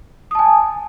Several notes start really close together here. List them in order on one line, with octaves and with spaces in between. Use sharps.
D#6 A5 G#5